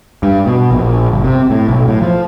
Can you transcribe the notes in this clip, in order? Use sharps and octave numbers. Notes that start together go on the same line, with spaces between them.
G2
B2
A#1
G1
C3
A2
B1
A2
F3